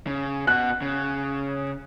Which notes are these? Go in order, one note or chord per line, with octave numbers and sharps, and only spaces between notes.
C#3
B2 F#4 F#6
C#3